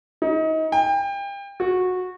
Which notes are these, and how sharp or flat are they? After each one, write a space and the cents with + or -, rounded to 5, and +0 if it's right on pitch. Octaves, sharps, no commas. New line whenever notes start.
D#4 +30
G5 +30
F#4 -15